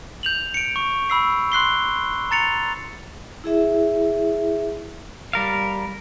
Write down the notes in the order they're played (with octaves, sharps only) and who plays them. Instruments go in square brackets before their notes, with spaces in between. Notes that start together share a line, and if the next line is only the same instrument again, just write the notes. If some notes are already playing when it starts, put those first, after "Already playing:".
[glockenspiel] G6 F7 F#7
C#7 D7
C#6
B5 E6 C7
C6 F#6 C7 G7
A#5 A6 C#7 F7
[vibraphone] E4 G#4 E5
[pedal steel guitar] G3 A#4 F5